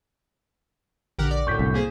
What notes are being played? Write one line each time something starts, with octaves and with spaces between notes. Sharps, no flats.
A#1 D3 G4 A#4 F#5
D5
F#2 A2 D3 C#6 G6 B6
C2
A#3 G#4 C5